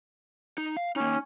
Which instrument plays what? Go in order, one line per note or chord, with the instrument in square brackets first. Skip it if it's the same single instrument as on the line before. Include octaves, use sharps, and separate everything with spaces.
[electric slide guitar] D#4
F5
[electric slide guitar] A#3 D#4 [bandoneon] C#4